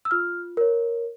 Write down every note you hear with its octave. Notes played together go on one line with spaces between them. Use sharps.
E6
F4 F6
A#4 C#5